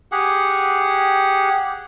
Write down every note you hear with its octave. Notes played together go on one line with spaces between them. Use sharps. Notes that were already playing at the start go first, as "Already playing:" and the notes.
G4 G#4 F#5